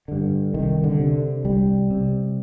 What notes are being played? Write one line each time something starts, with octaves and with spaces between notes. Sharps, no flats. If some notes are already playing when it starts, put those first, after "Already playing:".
G2 D3
C2 D#3
D3
C3
C2 G3
C3